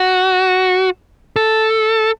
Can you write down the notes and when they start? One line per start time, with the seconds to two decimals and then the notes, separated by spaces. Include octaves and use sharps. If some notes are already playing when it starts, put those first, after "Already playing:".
Already playing: F#4
1.36 A4